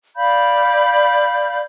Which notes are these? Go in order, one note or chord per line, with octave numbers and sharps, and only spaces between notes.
D5 F5 B5 G6